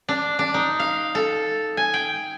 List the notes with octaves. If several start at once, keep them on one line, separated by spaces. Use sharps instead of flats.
D4
D4
D#4
F5
A4
G#5
G5